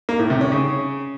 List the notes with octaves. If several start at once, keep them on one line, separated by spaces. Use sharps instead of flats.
A#3
A2
C3
C#4
C#3